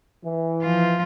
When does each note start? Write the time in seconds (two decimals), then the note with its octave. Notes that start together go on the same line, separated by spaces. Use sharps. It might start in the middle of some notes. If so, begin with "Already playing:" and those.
0.25 E3
0.63 F3 F4